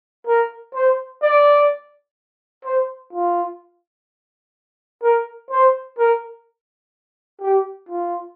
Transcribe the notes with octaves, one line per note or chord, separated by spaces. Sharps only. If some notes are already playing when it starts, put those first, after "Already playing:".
A#4
C5
D5
C5
F4
A#4
C5
A#4
G4
F4